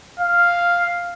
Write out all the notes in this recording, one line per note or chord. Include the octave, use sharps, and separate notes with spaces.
F5